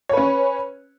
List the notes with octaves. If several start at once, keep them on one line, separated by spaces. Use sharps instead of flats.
C#4 B4 C#5